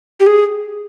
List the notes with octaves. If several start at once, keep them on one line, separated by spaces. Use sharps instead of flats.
G4
G#4